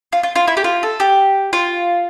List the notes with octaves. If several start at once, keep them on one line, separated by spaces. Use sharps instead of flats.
F4
F4
F4
E4
G4
F4
A4
G4
F4